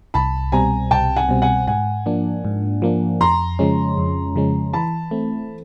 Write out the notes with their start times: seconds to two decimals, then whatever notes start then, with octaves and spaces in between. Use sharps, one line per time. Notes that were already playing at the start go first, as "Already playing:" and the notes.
0.14 C2 A5 B5
0.52 B2 G3 C4 G#5 A#5
0.91 C2 G5 A5
1.16 F#5 G#5
1.29 B2 G3 C4
1.42 F#5 G#5
1.67 G#2 F#5 G#5
2.06 F3 A#3 D4
2.45 G#2
2.82 F3 A#3 D4
3.20 F2 A#5 C6
3.59 C#3 F3 G#3 C#4
3.98 F2
4.36 C#3 F3 G#3 C#4
4.73 E3 A5 B5
5.11 A3 C4